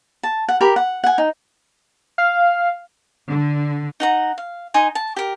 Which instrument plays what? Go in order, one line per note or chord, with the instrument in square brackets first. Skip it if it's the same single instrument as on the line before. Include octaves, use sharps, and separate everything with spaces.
[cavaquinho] A5
F#5
G4 A#4 B5
F#5
F#5 G#5
D#4
[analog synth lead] F5
[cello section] D3
[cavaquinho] D#4 F#5 A#5
F5
D#4 G#5 C6
A5
G4 A#4